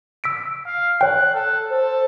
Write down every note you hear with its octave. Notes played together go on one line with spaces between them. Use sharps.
E6 B6 D7
F5
C#5 G5 F#6
A4
A4 C5